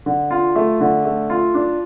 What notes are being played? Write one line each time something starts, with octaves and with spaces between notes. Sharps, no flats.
D3
F4
A3
D3
A3
F4
D4